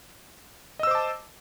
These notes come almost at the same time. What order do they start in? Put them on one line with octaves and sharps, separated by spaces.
D#5 E6 C5 D6 A5